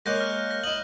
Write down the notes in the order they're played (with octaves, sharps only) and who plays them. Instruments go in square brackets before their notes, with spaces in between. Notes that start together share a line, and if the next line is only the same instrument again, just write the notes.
[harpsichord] G#3 A#3 C#5 [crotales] F#6 G6 A#6
[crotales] F6 A#6
A#6
[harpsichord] E4 D#5 [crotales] F#7